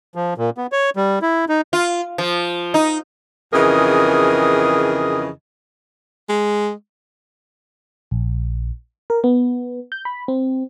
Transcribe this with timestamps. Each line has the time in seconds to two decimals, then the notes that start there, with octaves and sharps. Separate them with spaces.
0.15 F3
0.38 A#2
0.58 B3
0.72 C#5
0.96 G3
1.22 E4
1.49 D#4
1.73 F4
2.18 F3
2.74 D#4
3.54 F2 C#3 E3 G#4 A#4 D#5
6.29 G#3
8.11 A#1
9.10 A#4
9.24 B3
9.92 G6
10.05 B5
10.28 C4